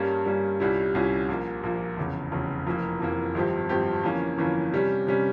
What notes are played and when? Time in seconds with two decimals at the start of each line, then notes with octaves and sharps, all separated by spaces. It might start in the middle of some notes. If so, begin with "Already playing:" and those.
Already playing: G2 G3 A#3 C#4
0.25 G2 G3 A#3 C#4
0.60 C2 A#2 G3 C#4 E4
0.95 C2 A#2 G3 C#4 E4
1.28 A#1 A#2 F3 A#3
1.63 A#1 A#2 F3 A#3
1.97 F1 E2 C#3
2.32 F1 E2 C#3
2.67 F1 F2 E3 A#3
3.00 F1 F2 E3 A#3
3.35 G#1 G2 F3 C4 G4
3.69 G#1 G2 F3 C4 G4
4.04 G1 F2 E3 A#3 C#4
4.38 G1 F2 E3 A#3 C#4
4.72 C3 G3 C#4
5.07 C3 G3 C#4